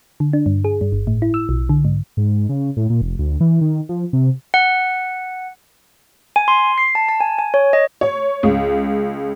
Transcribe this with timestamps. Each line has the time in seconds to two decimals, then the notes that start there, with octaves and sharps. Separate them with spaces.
0.20 D3
0.33 D4
0.46 G2
0.65 G#4
0.81 G2
0.92 G1
1.07 A2
1.22 E4
1.34 E6
1.49 B1
1.69 D3
1.85 G#2
2.17 G#2
2.49 C#3
2.77 A2
2.90 A#2
3.02 F1
3.19 D2
3.40 E3
3.61 D#3
3.89 F3
4.13 C3
4.54 F#5
6.36 G#5
6.48 C6
6.78 C7
6.95 A5
7.09 A5
7.21 G#5
7.39 G#5
7.54 C#5
7.73 D#5
8.01 C#5
8.43 C#2